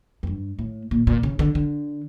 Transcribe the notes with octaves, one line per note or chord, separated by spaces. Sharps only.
F2
G2
A2
A#2
A#2
C#3
D3
D3